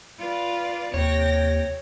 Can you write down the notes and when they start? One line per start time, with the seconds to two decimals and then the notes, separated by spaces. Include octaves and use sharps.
0.20 F4 B4 D5
0.94 D#2 C3 C#5 G5 A#6